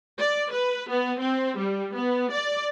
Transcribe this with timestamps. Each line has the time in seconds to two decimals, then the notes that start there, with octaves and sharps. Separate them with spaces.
0.18 D5
0.51 B4
0.89 B3
1.20 C4
1.57 G3
1.93 B3
2.30 D5